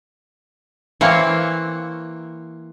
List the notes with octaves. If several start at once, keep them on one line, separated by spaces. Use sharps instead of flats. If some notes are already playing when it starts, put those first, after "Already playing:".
E3 A#3 C4 C#5